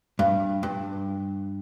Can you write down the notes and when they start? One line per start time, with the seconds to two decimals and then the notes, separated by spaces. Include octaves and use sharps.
0.19 G2
0.63 G2